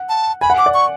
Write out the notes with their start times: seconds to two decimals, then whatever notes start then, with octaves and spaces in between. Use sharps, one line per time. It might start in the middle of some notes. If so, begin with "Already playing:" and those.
Already playing: F#5
0.09 A5
0.41 G#5 B5
0.50 F#5
0.58 D6
0.66 D5
0.74 C#6